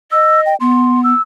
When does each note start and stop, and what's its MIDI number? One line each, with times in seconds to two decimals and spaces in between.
0.12 0.54 75
0.12 0.41 88
0.46 0.56 79
0.60 1.13 59
0.60 1.01 84
1.04 1.22 88